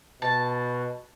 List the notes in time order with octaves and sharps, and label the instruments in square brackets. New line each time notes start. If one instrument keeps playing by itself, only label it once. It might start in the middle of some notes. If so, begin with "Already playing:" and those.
[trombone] B2 [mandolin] A5